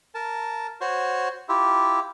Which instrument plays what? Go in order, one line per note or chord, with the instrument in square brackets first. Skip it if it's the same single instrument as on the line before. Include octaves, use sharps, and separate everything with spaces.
[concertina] A#4 A5
F#4 C5 C#5
E4 F4 G4